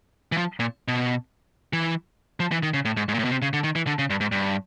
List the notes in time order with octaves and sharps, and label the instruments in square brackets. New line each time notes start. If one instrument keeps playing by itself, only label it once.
[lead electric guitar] E3
F3
A#2
B2
E3
F3
E3
D#3
C#3
A2
G#2
G#2
A#2
A2
B2
C3
C#3
D3
D#3
E3
D3
C#3
G2
G#2
G2